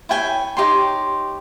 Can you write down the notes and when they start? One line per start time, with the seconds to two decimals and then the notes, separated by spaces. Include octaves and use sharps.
0.09 E4 C#5 G5 G#5
0.57 D#4 G4 C#5 C6